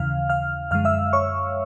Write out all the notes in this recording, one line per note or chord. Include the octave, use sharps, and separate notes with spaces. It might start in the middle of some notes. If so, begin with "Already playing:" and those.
Already playing: D#2 C#3 E3 F5 F6
F5 F6
F#2 D3 F3 G#3 F5 F6
E5 E6
C#5 C#6